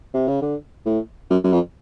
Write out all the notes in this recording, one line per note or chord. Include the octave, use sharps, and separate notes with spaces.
C3
C#3
D3
A2
F#2
F#2
F2